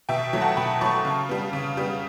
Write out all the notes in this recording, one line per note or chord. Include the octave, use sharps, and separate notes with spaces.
B2 E5 G5
F#3 A3
F#5 A5
B2 G5 B5
F#3 A3 A5 C#6
C#3
G3 B3
C#3
G3 B3